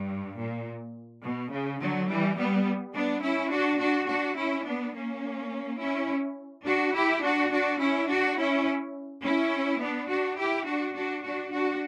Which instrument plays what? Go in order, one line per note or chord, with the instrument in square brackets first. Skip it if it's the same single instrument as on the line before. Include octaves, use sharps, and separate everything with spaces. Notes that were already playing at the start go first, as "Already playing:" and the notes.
Already playing: [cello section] G2
A#2
B2
C#3
D3 F#3
E3 G3
G3 B3
B3 D4
C#4 E4
D4 F#4
D4 F#4
D4 F#4
C#4 E4
B3 D4
A#3 C#4
C#4 E4
D4 F#4
E4 G4
D4 F#4
D4 F#4
C#4 E4
D4 F#4
C#4 E4
C#4 E4
B3 D4
D4 F#4
E4 G4
D4 F#4
D4 F#4
D4 F#4
D4 F#4